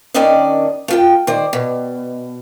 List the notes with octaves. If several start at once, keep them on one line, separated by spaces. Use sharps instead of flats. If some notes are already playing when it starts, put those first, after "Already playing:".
D#2 D#3 C#4 D4 D5 D#5
A3 F4 G5
D#3 C5 D5
B2